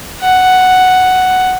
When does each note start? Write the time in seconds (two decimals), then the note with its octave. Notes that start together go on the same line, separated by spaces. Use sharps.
0.22 F#5